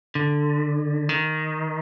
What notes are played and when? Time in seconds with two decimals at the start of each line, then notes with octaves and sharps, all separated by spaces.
0.15 D3
1.09 D#3